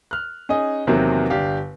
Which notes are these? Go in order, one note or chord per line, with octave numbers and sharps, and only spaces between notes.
F6 F#6
C#4 D#4 G#4 D#5
E2 C3 D#3 F#3 A#3 C4
G1 D4 G4 F5